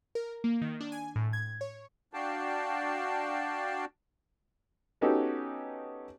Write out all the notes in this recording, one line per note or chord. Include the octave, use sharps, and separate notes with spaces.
A#4
A#3
D#3
D4
G#5
A2
G#6
C#5
D4 F#4 D5 F5 G5 A5
B3 C#4 D#4 F#4 G4 A4